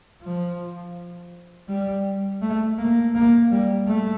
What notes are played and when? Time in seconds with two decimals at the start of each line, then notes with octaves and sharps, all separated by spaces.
0.22 F3
1.68 G3
2.41 A3
2.78 A#3
3.15 A#3
3.51 G3
3.88 A3